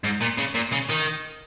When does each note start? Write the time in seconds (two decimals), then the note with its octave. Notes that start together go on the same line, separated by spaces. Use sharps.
0.04 G#2
0.21 A#2
0.38 C#3
0.55 A#2
0.72 C#3
0.89 D#3